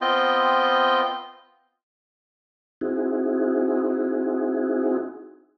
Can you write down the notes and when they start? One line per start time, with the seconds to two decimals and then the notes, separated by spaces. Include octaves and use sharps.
0.01 B3 C4 F4 D#5 G5
2.81 C4 D#4 E4 F#4 G#4